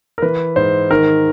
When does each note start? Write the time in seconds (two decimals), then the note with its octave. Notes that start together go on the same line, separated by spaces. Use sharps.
0.18 A#4
0.22 E3 B4
0.56 G#2 C5
0.90 D#3 A#4